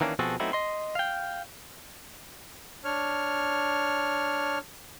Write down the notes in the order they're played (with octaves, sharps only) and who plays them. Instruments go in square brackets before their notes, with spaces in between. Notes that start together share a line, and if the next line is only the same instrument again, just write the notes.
[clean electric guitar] D#3 E3 A#3 C#4 D4
B2 F3 C4 F#4 G#4 A4
F#3 A3 B3 C4 D#4 E4
D#5 C6
F5 G5
[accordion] D4 C#5 F6